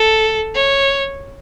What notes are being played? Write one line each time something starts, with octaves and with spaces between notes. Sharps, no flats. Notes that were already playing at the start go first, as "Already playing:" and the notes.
Already playing: A4
C#5